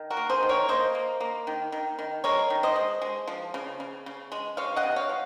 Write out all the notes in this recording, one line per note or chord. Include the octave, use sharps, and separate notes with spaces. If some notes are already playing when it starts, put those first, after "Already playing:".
Already playing: D#3
F#4 A#4
A#3
G#4 C5
D#3
A#4 C#5
A#3 C5 D#5
A#3
A#3
D#3
D#3
D#3
G#3 A#4 C#5
D#3
C5 D#5
G#3
G#3
F3
C#3
C#3
C#3
G#3
G#3 C#5 F5
D#5 F#5
C3
C#5 F5
F3